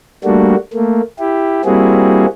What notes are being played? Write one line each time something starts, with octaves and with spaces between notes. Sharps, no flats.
G3 A3 A#3 D4 F#4
A3 A#3
E4 G4
G3 A#3 C4 E4 F#4 G#4